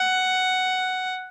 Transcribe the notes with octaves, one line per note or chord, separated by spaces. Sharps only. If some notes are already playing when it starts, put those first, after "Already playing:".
Already playing: F#5